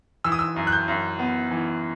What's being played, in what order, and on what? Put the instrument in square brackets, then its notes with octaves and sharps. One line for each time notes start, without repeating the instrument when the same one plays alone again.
[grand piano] E3 E6
D#6
E6
F#2
F#6
G6
F#2
B3
E3